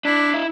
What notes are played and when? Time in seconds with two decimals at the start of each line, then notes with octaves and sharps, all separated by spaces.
0.05 D4 E4
0.34 E4